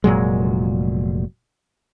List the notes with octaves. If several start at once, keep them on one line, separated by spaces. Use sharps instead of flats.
F1 A#2 F#3 G#3